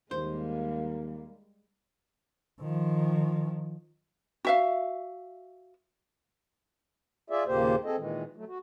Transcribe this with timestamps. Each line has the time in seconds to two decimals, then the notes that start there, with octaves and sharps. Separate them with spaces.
0.11 D#2 G3 G#3 A#3 C5
2.60 D#3 F3
4.45 F#4 E5 F5
7.30 F4 G#4 D5 E5
7.47 D#2 A#2 C#3 A#3 G4 C5
7.85 C4 G#4 A4 D#5
7.97 A#2 D#3 E3 G#3
8.36 F#3 A3
8.48 F#4